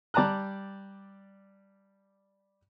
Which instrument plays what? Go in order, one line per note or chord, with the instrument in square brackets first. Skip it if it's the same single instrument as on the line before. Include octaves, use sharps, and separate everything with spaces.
[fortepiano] G3 D5 A5 A#5 F#6